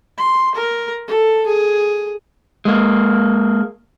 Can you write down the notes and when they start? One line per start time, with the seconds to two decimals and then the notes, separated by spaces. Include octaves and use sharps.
0.17 C6
0.55 A#4
1.07 A4
1.46 G#4
2.65 G#3 A#3